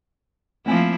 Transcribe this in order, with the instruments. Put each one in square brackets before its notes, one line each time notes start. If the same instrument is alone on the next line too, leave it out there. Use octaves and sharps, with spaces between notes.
[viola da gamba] F3 A#3 E4 [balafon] A3 C4 G#5